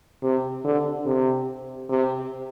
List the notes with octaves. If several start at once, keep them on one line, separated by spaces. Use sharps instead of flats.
C3
D3
C3
C3